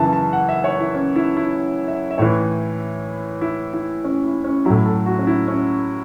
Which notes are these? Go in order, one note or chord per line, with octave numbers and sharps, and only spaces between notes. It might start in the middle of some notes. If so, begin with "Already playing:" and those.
Already playing: F#2 C#3 E3 E5 A5
A5
F#5
E5
C#5
E4
C#4
E4
E4
E5
E5
A2 E3 C#5
E4
E4
C#4
E4
C#4
A2 F#3 E4
A4
F#4
C#4
E4
C#4